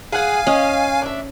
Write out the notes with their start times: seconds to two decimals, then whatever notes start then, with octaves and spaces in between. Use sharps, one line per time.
0.12 G#4 F5 F#5 G#5
0.47 C#4 D#5
1.02 D4 E5